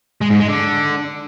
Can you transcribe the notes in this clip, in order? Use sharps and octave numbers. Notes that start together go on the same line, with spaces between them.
G#3
G#2
G#3
D3